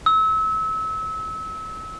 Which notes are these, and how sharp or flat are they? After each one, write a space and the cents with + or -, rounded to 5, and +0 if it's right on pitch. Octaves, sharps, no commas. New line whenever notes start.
E6 -30